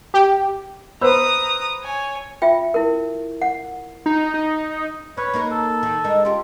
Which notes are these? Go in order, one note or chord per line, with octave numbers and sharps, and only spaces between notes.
G4
B4 C5 A#5 D#6 E6
C#5 G#5
F4 E5 G5
E4 A#4
F#5
D#4
D#4
C#4 B4 C#5
A#3 D#4 A#4
A4
D#3
G#3 D#4 A#4
C#4 F4 G4